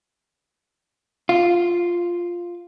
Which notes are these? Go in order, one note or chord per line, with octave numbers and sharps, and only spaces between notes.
F4